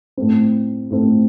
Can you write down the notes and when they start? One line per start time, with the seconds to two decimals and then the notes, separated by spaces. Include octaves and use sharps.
0.17 A2 A3 C4
0.91 A2 A3 C4